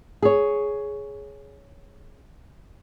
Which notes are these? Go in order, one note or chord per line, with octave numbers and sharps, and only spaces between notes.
G#4 C#5